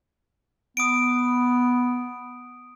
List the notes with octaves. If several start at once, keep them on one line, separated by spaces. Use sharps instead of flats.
B3 D#6 D7